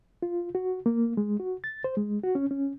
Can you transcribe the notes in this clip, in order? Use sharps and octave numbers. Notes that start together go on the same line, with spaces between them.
F4
F#4
A#3
G#3
F#4
A6
C5
G#3
F#4
C#4
C#4